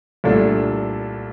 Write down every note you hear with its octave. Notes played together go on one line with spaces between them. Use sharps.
C2 A#2 A3 D4 A4